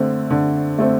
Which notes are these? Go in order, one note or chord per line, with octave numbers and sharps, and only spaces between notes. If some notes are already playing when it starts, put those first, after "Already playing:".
Already playing: D3 A3 C4
D3
A3 C4